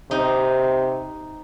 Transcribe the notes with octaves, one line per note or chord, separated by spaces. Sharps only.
C3 D#4